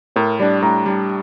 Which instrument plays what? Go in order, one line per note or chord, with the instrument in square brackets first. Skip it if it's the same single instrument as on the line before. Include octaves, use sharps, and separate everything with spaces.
[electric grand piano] A2 [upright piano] A#4
[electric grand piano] G3 D4 [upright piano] D5
[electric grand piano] A2 [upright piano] A#5
[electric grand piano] G3 D4